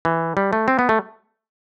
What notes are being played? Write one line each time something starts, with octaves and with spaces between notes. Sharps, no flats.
E3
G3
A3
C4
B3
A3